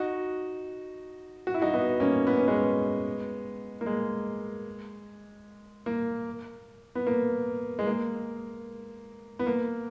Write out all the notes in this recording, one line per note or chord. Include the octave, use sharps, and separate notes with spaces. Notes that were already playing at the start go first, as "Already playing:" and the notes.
Already playing: D#4 F#4
F#4
E4
D#4 F#4
B3 D#4
A#3 C#4
B3
C#4
G#3 B3
A#3
G#3
A#3
B3
A#3
G#3
A#3
B3
A#3